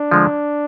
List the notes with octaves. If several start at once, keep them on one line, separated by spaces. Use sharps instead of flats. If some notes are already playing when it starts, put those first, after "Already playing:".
Already playing: D4
D3 F3 G#3